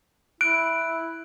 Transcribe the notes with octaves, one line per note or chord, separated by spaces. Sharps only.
E4 F#6 D7